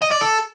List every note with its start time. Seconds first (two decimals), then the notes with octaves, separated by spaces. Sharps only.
0.02 D#5
0.11 D5
0.21 A4